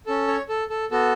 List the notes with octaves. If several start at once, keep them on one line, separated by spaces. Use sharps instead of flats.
C#4 A4
C#5
A4
A4
B3 F#4 A4